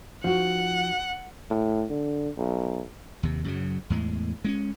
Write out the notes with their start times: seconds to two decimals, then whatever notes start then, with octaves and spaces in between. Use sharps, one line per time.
0.24 F3 D#4 F#4 F#5
1.50 A2
1.90 D3
2.37 B1
3.23 D#2 C3
3.44 F#2 C#3 F#3
3.90 E2 A2 G#3
4.44 G#3 C4 C#4